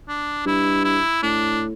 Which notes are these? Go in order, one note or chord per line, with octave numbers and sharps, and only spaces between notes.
D4
G2 E4
E4
A2 D4